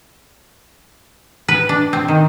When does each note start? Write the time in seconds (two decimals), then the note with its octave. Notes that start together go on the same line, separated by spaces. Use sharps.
1.48 B4
1.69 D4
1.93 C4
2.08 D#3